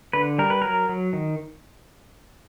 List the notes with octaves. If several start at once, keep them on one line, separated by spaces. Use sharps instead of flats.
D3 B4
G3 A#4
B4
F#3 A#4
F#3
D#3